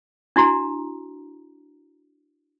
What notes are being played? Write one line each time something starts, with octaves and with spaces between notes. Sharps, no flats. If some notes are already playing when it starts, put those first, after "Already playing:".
D4 E4 F#4 A#5